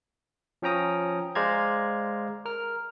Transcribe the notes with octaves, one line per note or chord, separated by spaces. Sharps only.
F3 C#4 G5 A#5 D#6
G#3 C5 D5 F5 A#5 G#6
A#4 F6